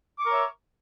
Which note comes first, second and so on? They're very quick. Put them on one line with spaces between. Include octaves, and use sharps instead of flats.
D6 C#6 A#4 C#5 E5